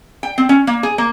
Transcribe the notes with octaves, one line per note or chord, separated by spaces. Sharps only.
G5
C4
C#4
A#3
G#4
A#3